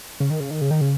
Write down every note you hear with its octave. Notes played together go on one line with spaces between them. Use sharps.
C#3
D#3
C#3
D#3
C#3
D#3
C#3